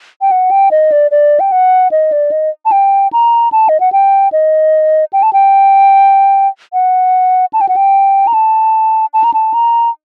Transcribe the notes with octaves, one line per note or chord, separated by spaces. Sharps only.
G5
F#5
G5
D#5
D5
D5
G5
F#5
D#5
D5
D#5
A5
G5
A#5
A5
D#5
F#5
G5
D#5
G5
A5
G5
F#5
A5
G5
F#5
G5
A#5
A5
A5
A#5
A5
A#5